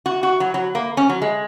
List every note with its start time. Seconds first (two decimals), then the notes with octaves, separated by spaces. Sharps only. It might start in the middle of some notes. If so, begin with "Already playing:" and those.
0.06 F#4
0.23 F#4
0.40 F#3
0.54 F#3
0.75 A#3
0.97 C#4
1.09 F#3
1.22 G#3